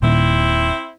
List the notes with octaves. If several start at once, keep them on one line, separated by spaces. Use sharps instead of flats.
D#1 A#2 D#3 C4 E4